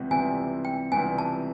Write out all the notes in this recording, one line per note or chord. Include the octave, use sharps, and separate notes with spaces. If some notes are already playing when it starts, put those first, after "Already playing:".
Already playing: C#2 C3 E3 G3 B3
C#2 C3 E3 G3 B3 G#5
G5
C#2 C3 E3 G3 B3 G#5
A5